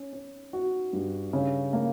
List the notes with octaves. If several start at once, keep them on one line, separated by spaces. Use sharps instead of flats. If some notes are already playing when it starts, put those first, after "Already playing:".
Already playing: C#4
C#4
F#4
G2
C#3
A#3